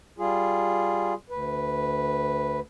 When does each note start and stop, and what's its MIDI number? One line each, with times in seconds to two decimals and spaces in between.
0.19 1.14 55
0.19 1.14 65
0.19 1.14 68
1.30 2.60 38
1.30 2.60 71